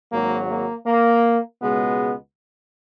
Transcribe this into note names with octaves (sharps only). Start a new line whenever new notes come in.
G#1 G#2 F#3 A#3
A#3
A#3
C#2 B2 G#3 B3